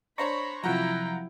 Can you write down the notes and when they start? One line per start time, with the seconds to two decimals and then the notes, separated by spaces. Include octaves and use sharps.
0.18 D4 C5 C#5 A#5 B5 C#6 A#6
0.64 C3 F3 F#3 E4 F4 F#5 G5 A#5